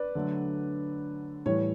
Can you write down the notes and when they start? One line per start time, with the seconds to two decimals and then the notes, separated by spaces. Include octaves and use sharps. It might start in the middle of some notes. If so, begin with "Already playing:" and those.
Already playing: B4 D5
0.15 D3 F#3 A3
1.46 A2 E3 G3 C#5